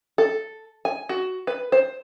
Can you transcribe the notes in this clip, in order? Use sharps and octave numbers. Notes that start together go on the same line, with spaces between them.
A4
G#5
F#4
B4
C5